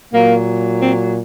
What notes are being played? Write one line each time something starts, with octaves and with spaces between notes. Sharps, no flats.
A#2 F#3 A#3
C4